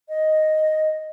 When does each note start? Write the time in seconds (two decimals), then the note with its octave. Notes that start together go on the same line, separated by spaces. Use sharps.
0.09 D#5